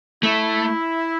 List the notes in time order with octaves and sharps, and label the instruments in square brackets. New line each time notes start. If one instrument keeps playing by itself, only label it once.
[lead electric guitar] A3 [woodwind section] E4